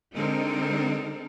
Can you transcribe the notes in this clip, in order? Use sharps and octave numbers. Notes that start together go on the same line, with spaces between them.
D3 G#3 C4 D#4 A4 A#4